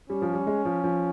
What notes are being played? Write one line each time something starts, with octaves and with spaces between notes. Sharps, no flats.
G3 C#4
F3
G3
G#3
F3
F3